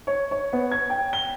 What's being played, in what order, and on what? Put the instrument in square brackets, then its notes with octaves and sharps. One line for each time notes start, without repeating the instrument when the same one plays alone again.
[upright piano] C#5
C#5
B3
G#6
G5
G7